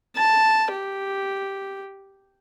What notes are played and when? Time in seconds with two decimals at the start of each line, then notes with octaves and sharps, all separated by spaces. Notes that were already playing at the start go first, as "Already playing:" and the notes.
0.16 A5
0.71 G4